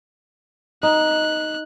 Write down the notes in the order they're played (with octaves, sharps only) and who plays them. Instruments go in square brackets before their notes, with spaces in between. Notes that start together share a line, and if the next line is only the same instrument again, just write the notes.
[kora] D#4 [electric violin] F#6